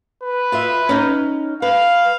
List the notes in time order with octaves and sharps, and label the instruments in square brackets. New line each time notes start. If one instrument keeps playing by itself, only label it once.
[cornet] B4
[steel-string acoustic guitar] F4 D#5 E5
C#4 D#4
[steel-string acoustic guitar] B4 [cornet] F5